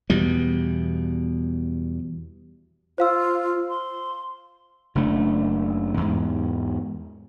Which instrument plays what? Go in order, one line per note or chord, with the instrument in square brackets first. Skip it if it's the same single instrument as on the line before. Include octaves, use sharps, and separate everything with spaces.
[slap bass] E2 B2 G3
[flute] F4 [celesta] C5 F5 E6
[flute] C6
[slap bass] F#1 C#3 A3 D4
E2 G#2